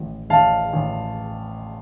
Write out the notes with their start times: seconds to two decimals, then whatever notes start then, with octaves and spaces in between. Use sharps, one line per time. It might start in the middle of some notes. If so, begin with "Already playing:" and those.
Already playing: A1 A2
0.30 A1 F5 A5
0.73 A1